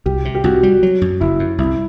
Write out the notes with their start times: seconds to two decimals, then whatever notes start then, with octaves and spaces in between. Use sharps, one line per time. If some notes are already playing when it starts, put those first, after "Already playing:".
0.06 C2 G4
0.25 C3
0.35 G4
0.44 C2 F#4
0.63 G3
0.83 F#3
1.02 F#2
1.21 F#1 E4
1.39 F#2
1.58 C2 E4